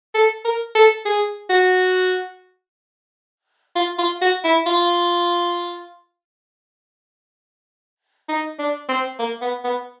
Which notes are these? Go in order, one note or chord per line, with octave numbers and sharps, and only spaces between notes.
A4
A#4
A4
G#4
F#4
F4
F4
F#4
E4
F4
D#4
D4
C4
A#3
B3
B3